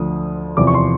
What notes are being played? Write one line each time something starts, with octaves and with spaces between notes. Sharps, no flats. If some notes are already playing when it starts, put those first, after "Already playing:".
Already playing: D2 D3 F3 D#6
E2 C3 F3 D6
C#6
C6